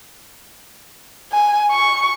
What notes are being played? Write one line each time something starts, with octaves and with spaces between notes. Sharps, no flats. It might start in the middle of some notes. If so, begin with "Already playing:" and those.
G#5
C#6